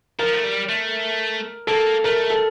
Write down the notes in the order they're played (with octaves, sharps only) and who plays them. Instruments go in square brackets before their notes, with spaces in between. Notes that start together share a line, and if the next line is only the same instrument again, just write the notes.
[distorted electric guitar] F3 [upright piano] A#4
[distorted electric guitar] A3
G3
A3
[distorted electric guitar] A#3 [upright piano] A4
[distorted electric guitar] A3 [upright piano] A#4
[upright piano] A4